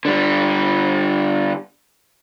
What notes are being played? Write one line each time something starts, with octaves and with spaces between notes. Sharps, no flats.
D3 G3